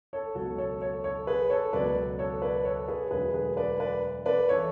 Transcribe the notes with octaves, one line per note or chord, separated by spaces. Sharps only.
A4 C#5
C#2 B2 F#3 F#4 A4
A4 C#5
A4 C#5
A4 C#5
G#4 B4
A4 C#5
C#2 B2 F#3 B4 D5
A4 C#5
B4 D5
A4 C#5
G#4 B4
E1 D2 D3 F#3 G#4 B4
G#4 B4
B4 D5
B4 D5
B4 D5
E3 A4 C#5